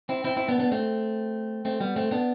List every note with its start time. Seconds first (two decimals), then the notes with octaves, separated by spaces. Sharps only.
0.09 C4 E4
0.24 C4 E4
0.37 C4 E4
0.49 B3 D4
0.59 B3 D4
0.72 A3 C4
1.65 A3 C4
1.81 G3 B3
1.96 A3 C4
2.11 B3 D4